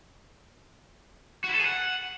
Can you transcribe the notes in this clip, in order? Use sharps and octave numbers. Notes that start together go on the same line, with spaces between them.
F#4
E4
A4
G#4
F#5